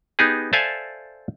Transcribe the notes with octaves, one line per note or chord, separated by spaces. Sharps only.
B3 D#4 G4 G#4
A4 C5 D5 E5 F5 G#5